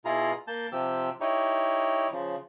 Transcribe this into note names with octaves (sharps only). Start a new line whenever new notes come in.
B2 E4 F4 G#4 A#5
A#3 A5 G6
C3 F3 G4 E6
D#4 E4 G4 C#5
C#3 F3